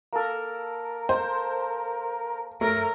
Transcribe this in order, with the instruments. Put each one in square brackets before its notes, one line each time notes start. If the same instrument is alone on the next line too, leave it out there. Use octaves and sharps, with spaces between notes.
[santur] A#3 A4 [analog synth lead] A#4
[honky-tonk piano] C5
[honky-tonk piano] A3 [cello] A#4 [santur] C#5